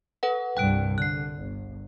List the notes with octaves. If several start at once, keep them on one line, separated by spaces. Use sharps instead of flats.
A4 B4 F#5
C2 G2 G3 G5 F#6 D7
D3 F#6 C7
G1